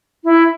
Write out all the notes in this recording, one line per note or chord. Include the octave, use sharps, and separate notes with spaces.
E4